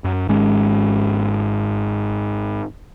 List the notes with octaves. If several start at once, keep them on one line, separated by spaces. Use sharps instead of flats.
F#2
G#1 G#2 G#3 C#4